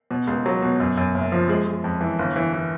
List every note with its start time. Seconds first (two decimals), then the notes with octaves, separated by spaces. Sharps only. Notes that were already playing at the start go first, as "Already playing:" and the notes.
0.11 B2
0.27 C#2
0.46 F#3
0.62 B2
0.80 F#2
0.97 F#2
1.14 F#1
1.32 F3
1.49 G#3
1.66 G#3
1.84 F2
2.01 E3
2.19 G1
2.36 E3
2.53 E3